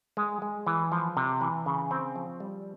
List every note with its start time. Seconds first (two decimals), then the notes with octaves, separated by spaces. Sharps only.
0.17 G#3
0.42 G#3
0.67 E3
0.92 F3
1.17 C3
1.41 E3
1.66 C#3
1.91 C4
2.16 F3
2.40 G3